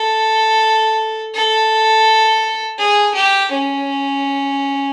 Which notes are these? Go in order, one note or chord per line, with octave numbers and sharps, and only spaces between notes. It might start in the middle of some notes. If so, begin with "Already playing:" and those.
Already playing: A4
A4
G#4
G4
C#4